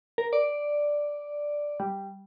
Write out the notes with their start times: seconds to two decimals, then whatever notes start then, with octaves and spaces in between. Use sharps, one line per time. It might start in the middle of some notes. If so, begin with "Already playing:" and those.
0.18 A#4
0.33 D5
1.80 G3